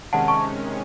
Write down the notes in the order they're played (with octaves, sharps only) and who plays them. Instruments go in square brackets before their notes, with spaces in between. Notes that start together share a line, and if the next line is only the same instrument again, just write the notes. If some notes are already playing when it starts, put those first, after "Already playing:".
[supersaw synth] C3 D#3 G#3 C#4 [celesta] F#5 A5
[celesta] A5 C#6